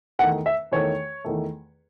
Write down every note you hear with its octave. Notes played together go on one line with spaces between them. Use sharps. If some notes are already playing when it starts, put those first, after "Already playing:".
E2 D#3 A3 F#5
E5
E2 D#3 A3 C#5
E2 D#3 A3